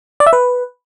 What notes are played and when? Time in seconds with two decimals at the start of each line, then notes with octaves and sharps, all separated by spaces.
0.20 D5
0.26 E5
0.33 B4